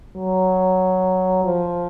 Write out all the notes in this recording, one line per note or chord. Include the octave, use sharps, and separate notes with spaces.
F#3
F3